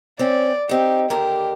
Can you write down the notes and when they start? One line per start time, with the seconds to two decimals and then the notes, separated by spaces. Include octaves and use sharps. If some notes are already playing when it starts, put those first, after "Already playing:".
0.19 C4 C#4 D5
0.69 C4 D#4 G4
1.10 D#2 D3 G4 A#4